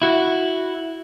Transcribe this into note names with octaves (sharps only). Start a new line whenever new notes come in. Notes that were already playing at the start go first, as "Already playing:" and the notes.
E4 F#4